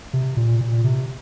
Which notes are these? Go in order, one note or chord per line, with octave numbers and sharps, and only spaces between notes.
C3
A#2
A#2
C3